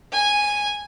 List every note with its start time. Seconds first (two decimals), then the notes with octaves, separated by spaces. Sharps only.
0.12 G#5